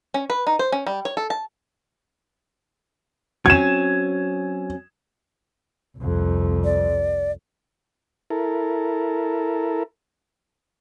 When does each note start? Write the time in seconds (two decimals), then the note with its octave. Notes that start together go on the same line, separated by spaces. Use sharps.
0.14 C#4
0.30 B4
0.47 D#4
0.59 C5
0.72 C#4
0.87 G3
1.05 C#5
1.17 A4
1.30 A5
3.46 F#3 C4 C#4 G#6 E7
5.98 C2 F2
6.64 D5
8.30 E4 A4 A#4